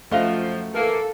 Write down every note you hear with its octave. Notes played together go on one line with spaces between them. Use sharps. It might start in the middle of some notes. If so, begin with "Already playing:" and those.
F#2 F3 A3 D#5 F5
E3 A#3 A4